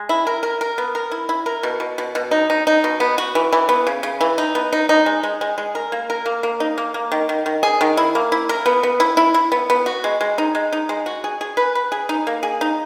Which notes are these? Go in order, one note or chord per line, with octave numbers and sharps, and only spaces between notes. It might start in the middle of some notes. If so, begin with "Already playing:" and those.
Already playing: G#3
E4
A#4
A#4
A#4
B3
A#4
E4
E4
A#4
B2
B2
B2
B2
D#4
D#4
D#4
B2
B3
F#4
E3
E3
B3
C#3
C#3
E3
D#4
B3
D#4
D#4
G#3
G#3
G#3
G#3
A#4
A#3
A#4
A#3
A#3
D#4
A#3
A#3
D#3
D#3
D#3
G#4
D#3
E4
A#3
E4
A#4
B3
B3
E4
E4
E4
B3
B3
F#4
G#3
G#3
D#4
G#3
D#4
G#3
F#4
G#4
G#4
B4
B4
G#4
D#4
A#3
G#4
D#4